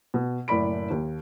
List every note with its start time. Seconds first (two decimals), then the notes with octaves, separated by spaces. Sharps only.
0.14 B2
0.48 F#1 A2 D5 B5 D7
0.90 D#2